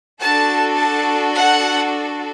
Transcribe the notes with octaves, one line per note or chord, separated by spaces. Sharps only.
D4 F#4 A4 A5
A5
F#5